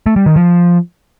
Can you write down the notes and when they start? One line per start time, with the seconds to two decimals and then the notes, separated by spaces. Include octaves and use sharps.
0.06 A3
0.16 G3
0.26 D#3
0.36 F3